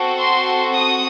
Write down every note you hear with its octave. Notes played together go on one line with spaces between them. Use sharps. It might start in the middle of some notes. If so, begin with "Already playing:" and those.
Already playing: C4 F#4 A4
C6
D#6